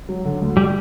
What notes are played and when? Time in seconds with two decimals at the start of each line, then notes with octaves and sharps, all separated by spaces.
0.09 F#3
0.25 D3
0.41 D2
0.57 G3